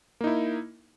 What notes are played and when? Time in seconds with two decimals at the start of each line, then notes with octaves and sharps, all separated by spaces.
0.21 A#3
0.24 D#4
0.27 E4